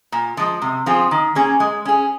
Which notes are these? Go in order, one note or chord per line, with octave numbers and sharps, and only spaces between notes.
A#2
F3 G#3
C3
F3 C4 F4 G#4
D#3
A#3 C#4 G#4
G#3
C#4 G#4